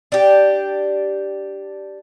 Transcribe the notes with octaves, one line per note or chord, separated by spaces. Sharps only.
D4 G4